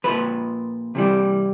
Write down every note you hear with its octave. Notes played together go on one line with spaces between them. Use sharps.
A#2 F3 B4
C3 E3 G3